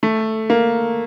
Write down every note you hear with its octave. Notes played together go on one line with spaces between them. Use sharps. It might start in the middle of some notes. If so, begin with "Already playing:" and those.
A3
A#3